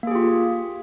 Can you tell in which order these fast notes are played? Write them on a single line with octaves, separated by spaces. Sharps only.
A#3 G#4 G4 F4